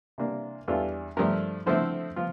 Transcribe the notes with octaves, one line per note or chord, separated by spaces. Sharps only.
C3 E3 A#3 D4
E2 E3 G3 D4 F4 A4
G2 F3 A3 D4 G4 A#4
D3 F3 A3 C4 E4 A4 C5
F3 F4